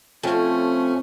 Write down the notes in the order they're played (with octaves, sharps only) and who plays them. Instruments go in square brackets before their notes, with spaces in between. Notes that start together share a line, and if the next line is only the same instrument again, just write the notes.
[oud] F2 [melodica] A3 C#4